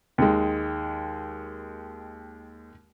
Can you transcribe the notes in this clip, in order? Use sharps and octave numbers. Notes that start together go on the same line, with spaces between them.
D#2 D#3 G#3